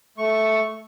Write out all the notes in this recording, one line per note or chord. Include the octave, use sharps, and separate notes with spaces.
A3 C#6